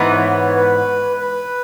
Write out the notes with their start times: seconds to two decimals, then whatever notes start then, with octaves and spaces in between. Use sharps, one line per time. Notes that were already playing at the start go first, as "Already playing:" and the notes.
Already playing: G#2 E3 B3
0.12 C#5
0.56 B4
1.19 B4